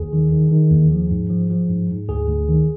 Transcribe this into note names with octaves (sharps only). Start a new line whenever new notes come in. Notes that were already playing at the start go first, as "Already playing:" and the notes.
Already playing: D#2 G#4
D#3
D#3
D#3
D#2
F3
G#2
F3
F3
G#2
G#2
D2 G#4
D2
D#3